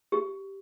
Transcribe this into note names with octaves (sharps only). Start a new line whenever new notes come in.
G4